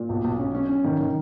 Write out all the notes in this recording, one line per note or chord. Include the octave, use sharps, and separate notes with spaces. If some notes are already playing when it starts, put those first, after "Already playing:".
Already playing: A#2
B1
B1
C#4
C#4
C#4
D#3
D#3